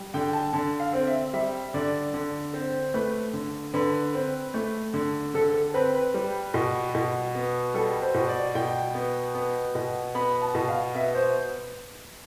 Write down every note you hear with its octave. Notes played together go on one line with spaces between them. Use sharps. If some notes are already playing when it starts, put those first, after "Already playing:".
Already playing: G3
D3 G5
A5
D3 A5
F5
C4
E5
G3 E5
D3 D5
D3
C4 C5
A3 B4
D3
D3 B4
C4
A3
D3
D3 A4
A4
C4 B4
B4
G3
B2
B2
B3
G3 A4
C5
B2
D5
B2 G5
B3
B3
B2
B3 B5
A5
B2
F5
B3 E5
C5